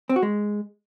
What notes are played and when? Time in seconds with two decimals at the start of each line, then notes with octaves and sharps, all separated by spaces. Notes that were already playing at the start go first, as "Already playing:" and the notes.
0.09 C4
0.16 F#4
0.23 G#3